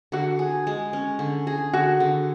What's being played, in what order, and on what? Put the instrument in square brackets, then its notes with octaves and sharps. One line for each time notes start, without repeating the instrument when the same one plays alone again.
[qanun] D3 [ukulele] F#4
[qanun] G#4
G#3
C#4
D3
G#4
[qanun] D3 [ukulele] F#4
[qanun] D3